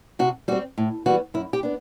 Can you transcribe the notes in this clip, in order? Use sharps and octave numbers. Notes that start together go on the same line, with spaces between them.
C3 F#4
G3 C4 F#4
A2
E3 G3 B3 F#4
F#2 E4
G4
B3 D4